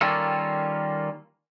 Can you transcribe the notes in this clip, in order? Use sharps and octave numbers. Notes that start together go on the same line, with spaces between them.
D#3 G3 A#3 C#4 F4 A4